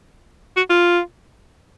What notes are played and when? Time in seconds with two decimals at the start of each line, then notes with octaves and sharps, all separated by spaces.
0.57 F#4
0.70 F4